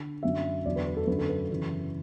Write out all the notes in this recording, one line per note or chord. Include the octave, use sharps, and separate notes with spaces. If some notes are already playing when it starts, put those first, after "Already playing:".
Already playing: D3
F#2 D3 F#3 E5
E2 D3 F#3 D5
B4
B4
A4
F#2 D3 F#3 B4
A4
B4
F#2 C#3 E3